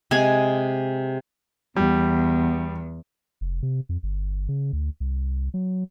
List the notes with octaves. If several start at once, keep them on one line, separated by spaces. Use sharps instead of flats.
C3 G#3 G#4 G#5
E2 G3 B3
F1
C3
F2
G1
C#3
D2
C2
F#3